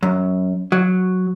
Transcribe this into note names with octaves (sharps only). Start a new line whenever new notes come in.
F#2
F#3